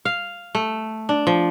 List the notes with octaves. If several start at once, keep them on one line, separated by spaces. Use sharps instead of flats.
F5
A3
D4
F3